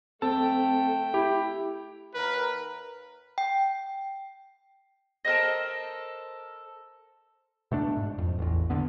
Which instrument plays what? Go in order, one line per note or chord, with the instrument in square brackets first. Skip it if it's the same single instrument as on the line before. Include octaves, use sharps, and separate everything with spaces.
[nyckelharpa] A3 G5 [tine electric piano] C4 A4 [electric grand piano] A5
[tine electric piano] E4 [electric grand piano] G4
[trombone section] D#2 A#4 [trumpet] B4
[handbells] G5
[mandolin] A4 A#4 C5 D#5
[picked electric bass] B2 A3 D4
G#2
F2
A1 E2
A1 D2 D3 B3